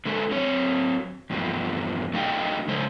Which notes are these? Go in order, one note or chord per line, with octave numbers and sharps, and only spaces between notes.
D3 G#3 A4
F#3 C4 C#5
E2 G2 B2 F3
A3 D4 D#4 F#4 F5 G5
C#3 G#3 C5